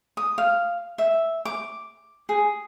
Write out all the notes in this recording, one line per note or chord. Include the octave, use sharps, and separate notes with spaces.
D#6
F5
E5
D6
G#4